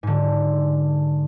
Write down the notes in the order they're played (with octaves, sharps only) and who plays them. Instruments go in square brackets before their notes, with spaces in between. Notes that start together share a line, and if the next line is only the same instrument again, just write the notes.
[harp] G#2 D3